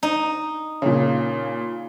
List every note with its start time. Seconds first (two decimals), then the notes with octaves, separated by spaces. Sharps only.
0.03 D#4
0.82 A#2 C#3